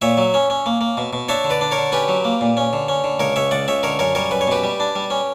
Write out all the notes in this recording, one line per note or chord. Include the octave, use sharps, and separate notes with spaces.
A#2 C#5 E5
F#3
C#4
C#4
A#3
A#3
B2
B2
D4 C#5 E5
D3
B4 D5
D4
A#4 C#5
D3
C#4 G4 B4
F#3
A#3
A#2
C#4
D3
C#4
D3
C#2 A#4 C#5
C#2 C#5 E5
C#2 D5 F#5
C#2 C#5 E5
D3 A#4 C#5
F#2 A#4 C#5
G3 A#4 C#5
F#2 B4
C#5
B2 G4 B4
G3
D4
G3
C#4